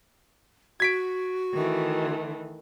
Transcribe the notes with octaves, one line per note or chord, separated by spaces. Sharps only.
F#4 G#6 B6 D7
D#3 E3 A3